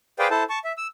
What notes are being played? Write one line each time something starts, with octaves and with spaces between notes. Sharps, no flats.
G#4 B4 C5 D5 F5 G5
E4 A4 C5 A5
A5 C#6
E5
E6